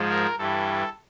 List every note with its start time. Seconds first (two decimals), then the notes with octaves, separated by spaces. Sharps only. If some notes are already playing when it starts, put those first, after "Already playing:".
Already playing: G#2 F3 G#3
0.10 A#4
0.38 G2 E3 G3 A4